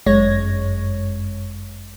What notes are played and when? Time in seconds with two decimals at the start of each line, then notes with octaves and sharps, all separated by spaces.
0.06 G1 F#2 G#3 C#5 G#6 A#6